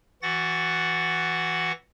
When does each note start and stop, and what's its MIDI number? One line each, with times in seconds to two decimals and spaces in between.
0.22 1.72 52
0.22 1.72 66
0.22 1.72 78
0.22 1.72 93
0.22 1.72 94